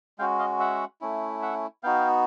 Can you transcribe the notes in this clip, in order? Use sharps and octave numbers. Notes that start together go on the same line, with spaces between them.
G#3 C#4 F#4 F5 G5
D#5 F5
E5 F#5
A3 C#4 E4
E5 F#5
B3 D#4 F#4 F5 G5